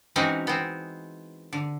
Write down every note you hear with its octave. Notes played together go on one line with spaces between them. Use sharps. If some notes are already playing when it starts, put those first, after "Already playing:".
E3 G#3 C4 C#4 D#4 F#4
B3 C4
D3